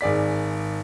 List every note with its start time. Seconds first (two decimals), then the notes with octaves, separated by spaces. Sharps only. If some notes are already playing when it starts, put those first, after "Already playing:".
0.01 G#1 G#4 D5 B6